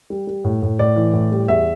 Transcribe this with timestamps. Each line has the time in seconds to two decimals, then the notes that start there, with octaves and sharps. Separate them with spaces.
0.10 G3
0.27 G3
0.44 A2
0.62 A2
0.79 A2 D5
0.96 E3
1.13 A2
1.32 G3
1.48 E2 E5